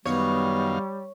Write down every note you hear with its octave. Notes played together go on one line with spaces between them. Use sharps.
F#2 D#3 G3 B3 C#5 F5